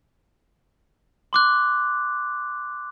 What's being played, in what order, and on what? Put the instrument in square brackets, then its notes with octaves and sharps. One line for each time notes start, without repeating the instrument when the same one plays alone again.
[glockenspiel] C6 D6 F#6